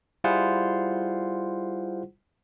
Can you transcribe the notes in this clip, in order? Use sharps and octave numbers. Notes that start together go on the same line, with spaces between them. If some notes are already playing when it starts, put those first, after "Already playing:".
G3 E4 F4 G#4 C5 F#5